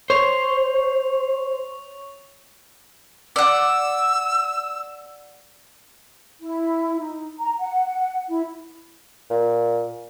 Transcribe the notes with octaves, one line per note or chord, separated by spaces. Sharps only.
C5 C#5 C#6 F7
D5 F#5 E6
E4
D#4
A#5
F#5
E4
A#2